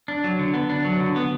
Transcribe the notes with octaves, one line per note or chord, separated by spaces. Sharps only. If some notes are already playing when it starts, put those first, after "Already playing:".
D4
F#3
D3
B3
D4
F#3
D3
B3